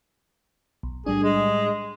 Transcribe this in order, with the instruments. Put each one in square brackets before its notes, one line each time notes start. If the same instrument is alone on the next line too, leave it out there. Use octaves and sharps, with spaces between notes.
[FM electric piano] B1
[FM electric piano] A2 G3 D4 [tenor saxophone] G#4
[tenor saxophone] G#3